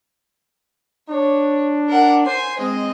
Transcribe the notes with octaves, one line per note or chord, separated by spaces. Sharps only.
D4 C#5
A#4 F#5
C5 G#5 C7
G#3 C4 D#5